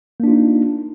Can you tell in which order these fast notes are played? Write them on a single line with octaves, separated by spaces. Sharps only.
A#3 D4 F4 D#4